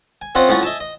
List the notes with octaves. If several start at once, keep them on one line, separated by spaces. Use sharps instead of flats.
G#5
C4 C#4 F4 D#5 F5 F#5
A2 C#4 F4 F#5 G#5 A#5
D#5 E5 G#5 A5
D#5